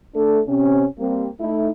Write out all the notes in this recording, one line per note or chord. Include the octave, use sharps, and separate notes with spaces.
A3 D4 A4
C3 C#4
G3 A#3 C4
A3 D#4 E4